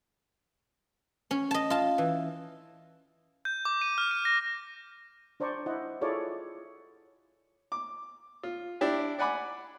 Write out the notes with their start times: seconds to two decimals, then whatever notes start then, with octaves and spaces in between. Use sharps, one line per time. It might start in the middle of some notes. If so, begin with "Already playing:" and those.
1.31 C#4
1.51 D#5 A5
1.70 F4 A5
1.98 E3
3.45 G6
3.65 D6
3.82 D#7
3.98 F6
4.11 D#7
4.25 A#6
5.40 D4 C5 D5 A#5 C#6
5.66 E4 C5 D#5 F#5
6.01 E4 F4 G#4 A4 C#5 D5
7.72 D6
8.43 F4
8.81 D4 E4 G4
9.19 D5 F#5 G#5 B5 D6